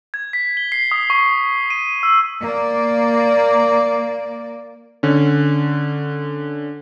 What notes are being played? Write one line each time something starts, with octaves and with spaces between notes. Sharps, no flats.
G#6
B6
G7
C7
D#6
C#6
D#7
E6
A#3 D5
D3 C#4